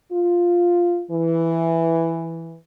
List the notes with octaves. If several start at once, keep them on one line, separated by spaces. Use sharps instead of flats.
F4
E3